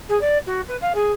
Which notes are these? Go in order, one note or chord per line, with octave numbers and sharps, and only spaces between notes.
G#4
D5
F#4
B4
F5
G#4